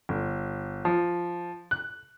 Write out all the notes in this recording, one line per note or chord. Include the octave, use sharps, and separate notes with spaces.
G1
F3
F#6